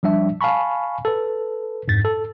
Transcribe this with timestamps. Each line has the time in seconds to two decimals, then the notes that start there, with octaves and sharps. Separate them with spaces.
0.03 F3 G3 D4 E5
0.41 F5 G#5 A5 B5 C#6
1.05 A4 B4
1.88 F2 G#2 A6
2.05 A4